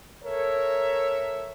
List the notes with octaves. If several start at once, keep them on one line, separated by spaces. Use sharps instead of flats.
A4 A#4 C#5 E5